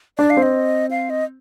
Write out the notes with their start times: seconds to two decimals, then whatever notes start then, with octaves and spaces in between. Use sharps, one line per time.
0.18 D4 D5
0.30 F5
0.37 C4
0.42 D#5
0.91 F5
1.10 D#5